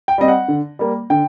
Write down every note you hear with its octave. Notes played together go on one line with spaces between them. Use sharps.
G5
G3 C4 D#5
F#5
D3
G3 A#3
D3 G5